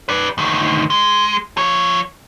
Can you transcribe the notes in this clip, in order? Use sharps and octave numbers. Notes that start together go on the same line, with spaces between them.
B4 D5
D2 D#3
G#3
F3 C#5